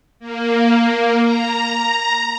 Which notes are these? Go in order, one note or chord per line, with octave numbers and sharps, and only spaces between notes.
A#3
A#5